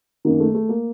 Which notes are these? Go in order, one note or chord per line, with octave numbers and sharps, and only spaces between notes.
F#2 D#3 A#3
A3
A3
A#3